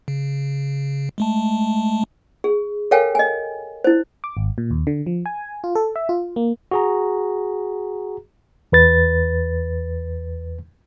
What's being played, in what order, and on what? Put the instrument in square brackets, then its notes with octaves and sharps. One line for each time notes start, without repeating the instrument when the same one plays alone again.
[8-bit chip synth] C#3
G#3 A3 A5
[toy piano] G#4
A4 A#4 C#5 F5 G5 G#5
D#5 G#5
E4 C5
[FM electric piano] D6
G#1
A#2
D#2
D3
F3
G#5
F4
A4
E5
F4
A#3
[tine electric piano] F#4 G#4 A#5
[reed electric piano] E2 B4 A6